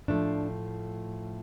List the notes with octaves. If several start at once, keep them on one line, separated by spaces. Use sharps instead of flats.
A2 F3 A3 D4